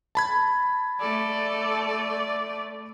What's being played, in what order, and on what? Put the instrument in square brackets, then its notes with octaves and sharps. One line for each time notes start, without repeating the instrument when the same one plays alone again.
[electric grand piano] A5 B5 G#6
[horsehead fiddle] A3 D5 [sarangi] A4